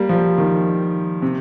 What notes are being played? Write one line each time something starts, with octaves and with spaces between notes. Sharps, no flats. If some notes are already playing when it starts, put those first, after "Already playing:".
Already playing: G3 A#3
F3
D#3
C3